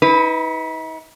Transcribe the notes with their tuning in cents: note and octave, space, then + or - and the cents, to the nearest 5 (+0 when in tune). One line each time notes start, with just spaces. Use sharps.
D#4 +45 B4 +0